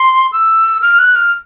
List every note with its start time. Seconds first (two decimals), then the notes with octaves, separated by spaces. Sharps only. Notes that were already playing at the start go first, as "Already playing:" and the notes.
Already playing: C6
0.32 E6
0.82 F6
0.99 F#6
1.16 F6